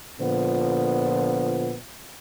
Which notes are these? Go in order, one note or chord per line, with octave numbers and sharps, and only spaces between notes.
A#2 D3 F3 B3